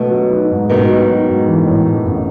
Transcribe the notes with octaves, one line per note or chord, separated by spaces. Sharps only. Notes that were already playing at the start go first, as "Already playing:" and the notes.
Already playing: B2 A3
F#3
D#4
G#2
B2 D#3 A3
F#3
D#4
G#2
E3
A2
A3
A1